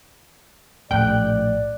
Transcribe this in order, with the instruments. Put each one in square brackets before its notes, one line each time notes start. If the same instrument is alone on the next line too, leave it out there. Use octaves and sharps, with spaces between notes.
[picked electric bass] A#1 A2 [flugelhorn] D5 [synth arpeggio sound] G5 [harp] F#6